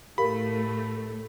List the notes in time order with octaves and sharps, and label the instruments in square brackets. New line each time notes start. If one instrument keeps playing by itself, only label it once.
[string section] A2 A3 [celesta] G4 A#4 F5 [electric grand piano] B5